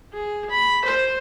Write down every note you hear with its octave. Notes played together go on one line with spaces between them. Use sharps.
G#4
B5
C5